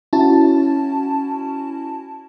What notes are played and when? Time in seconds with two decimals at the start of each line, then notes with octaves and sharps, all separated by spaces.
0.13 C#4 E4 F#4 A5